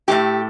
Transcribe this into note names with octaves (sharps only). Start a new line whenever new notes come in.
A2 E3 A3 G4